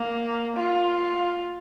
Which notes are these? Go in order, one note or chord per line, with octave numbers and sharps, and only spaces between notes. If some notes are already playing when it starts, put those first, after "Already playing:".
Already playing: A#3
F4